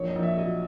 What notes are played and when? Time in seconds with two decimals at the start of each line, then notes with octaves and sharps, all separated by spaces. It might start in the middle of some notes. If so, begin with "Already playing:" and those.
Already playing: A#1 C#5
0.08 D#5
0.16 A#1
0.23 E5
0.37 F#3 D#5